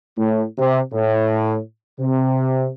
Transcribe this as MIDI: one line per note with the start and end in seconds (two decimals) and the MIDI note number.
0.17 0.43 45
0.58 0.80 48
0.92 1.57 45
1.99 2.69 48